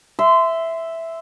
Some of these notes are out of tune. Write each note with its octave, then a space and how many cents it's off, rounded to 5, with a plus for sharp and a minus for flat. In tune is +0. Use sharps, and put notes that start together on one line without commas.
E5 +0 C6 -20